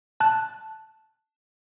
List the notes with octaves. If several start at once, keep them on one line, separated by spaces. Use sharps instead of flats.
A5 F#6